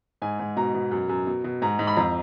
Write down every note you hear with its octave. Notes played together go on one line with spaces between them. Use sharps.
G#2 G#5
G#2
B2 A#5
B2
F#2
F#2
B2
B2
G#2 A#5
G#2
B5
F2 A#5